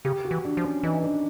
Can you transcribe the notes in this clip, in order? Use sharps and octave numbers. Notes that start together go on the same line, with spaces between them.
C#3 G4
F#4
E3
D4
F3
C#4
E3 D#4
D4